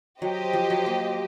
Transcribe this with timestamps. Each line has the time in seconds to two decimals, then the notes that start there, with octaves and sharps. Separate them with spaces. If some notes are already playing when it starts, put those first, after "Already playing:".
0.22 F#3 G4 C5 D#5
0.53 F3
0.70 F#3
0.86 A#3